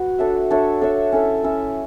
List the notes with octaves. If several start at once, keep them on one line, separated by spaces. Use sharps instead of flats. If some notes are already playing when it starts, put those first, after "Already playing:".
Already playing: F#4 B4
D4 A4 C#5 E5
D4 A4 C#5 E5
D4 A4 C#5 E5
C#4 E4 A4 E5
C#4 E4 A4 E5